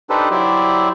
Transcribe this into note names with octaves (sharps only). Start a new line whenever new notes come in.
D4 D#4 G4 A4 B4 C5
F#3 E4 G4 C5 D5 E5